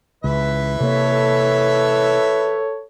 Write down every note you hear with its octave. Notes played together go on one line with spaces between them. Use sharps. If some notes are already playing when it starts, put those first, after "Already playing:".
C#2 E3 B4 E5
C3 A#3 A4 C#5